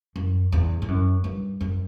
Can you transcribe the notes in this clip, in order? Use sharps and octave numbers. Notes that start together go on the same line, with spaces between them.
F#2
E2
G2
F#2
G2
F#2